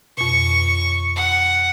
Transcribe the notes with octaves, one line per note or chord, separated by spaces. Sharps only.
F2 B2 C#6
F#5